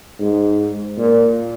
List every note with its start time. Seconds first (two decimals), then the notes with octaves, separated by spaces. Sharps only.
0.20 G#2
0.98 A#2